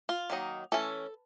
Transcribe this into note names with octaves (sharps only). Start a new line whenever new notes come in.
F4
D#3 F#3 A#3 D#4
E3 A3 C#4 A4